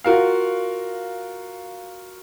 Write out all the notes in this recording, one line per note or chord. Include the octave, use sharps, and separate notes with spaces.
F4 F#4 A#4 F5